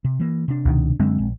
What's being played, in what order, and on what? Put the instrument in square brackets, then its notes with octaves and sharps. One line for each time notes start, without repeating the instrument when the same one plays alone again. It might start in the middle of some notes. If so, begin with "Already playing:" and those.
[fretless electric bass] C3
E3 A#3
C3 D4
[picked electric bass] C#2 B2 D#3
[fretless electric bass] F#2 D3 [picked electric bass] G#3 C4
[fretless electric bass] A#1